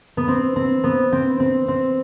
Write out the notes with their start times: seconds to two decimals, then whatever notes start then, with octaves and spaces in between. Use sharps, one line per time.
0.17 B3
0.28 C4
0.56 C4
0.84 B3
1.12 C4
1.40 C4
1.68 C4